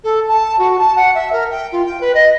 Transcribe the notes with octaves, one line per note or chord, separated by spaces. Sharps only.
A4
A5
F#4
A5
F#5
E5
A#4
G5
F4
G5
B4
D#5